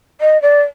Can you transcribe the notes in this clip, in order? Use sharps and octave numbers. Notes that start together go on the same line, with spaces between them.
D#5
D5